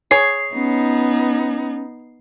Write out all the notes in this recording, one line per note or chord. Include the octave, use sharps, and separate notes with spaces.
G#4 C#5 C7
B3 C#4 D#4